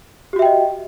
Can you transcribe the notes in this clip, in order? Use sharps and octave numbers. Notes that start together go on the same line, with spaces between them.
F#4 G4 D#5 E5 G5